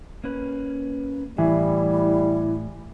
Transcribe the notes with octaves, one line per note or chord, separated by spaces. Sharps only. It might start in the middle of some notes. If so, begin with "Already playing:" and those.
A#3 C#4 B4
A2 E3 G3 E4